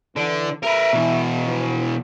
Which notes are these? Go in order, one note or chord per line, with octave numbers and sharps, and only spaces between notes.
D3 E3
A#4 B4 E5
B2 E3
F3 B3